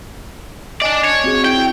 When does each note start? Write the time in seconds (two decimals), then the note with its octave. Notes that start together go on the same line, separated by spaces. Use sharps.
0.82 D4 D5 D#5 G#5
1.04 C#5
1.24 C4 F#4 G#4
1.45 E4 G5